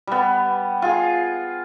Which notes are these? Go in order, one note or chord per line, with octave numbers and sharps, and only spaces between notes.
G3 B3
F4 G#4